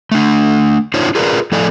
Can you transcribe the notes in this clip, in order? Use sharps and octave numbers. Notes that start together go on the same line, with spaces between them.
A3 D4
D4 D#4 F4 C5 C#5
F4 G#4 A#4 B4 D5
A2 F3 A4 D5 D#5 G#5